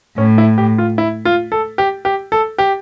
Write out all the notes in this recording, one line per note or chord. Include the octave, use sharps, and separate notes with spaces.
A2 C#4
E4
G4
F4
E4
F4
A4
G4
G4
A4
G4